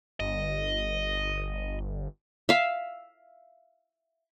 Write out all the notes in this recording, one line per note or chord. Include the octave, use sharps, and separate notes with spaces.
G1 D#5
E5 F5